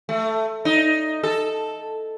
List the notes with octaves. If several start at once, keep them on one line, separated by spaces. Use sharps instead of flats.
A3
D#4
A4